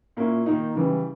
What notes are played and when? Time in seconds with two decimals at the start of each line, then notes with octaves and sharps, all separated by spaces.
0.17 A#2 A#3 C#4 E4
0.46 D#3 A#3 D#4
0.75 C#3 E3 G3